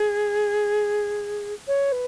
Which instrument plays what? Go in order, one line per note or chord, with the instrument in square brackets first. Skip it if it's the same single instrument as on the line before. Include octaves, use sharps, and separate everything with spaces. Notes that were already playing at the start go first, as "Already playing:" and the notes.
Already playing: [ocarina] G#4
C#5
B4